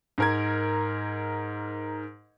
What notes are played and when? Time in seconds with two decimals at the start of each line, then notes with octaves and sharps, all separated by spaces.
0.18 G#2 A#4 G#6